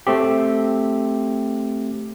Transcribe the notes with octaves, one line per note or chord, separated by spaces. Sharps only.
A3 C4 G4